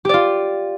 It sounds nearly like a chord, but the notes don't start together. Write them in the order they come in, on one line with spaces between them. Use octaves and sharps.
G4 D5 F4